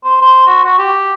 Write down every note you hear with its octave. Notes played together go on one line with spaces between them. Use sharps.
C5
C5
F#4
F#4
G4